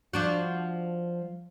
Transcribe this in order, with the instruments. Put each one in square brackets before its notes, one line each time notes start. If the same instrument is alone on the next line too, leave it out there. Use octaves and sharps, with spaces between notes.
[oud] F3 D4 F#4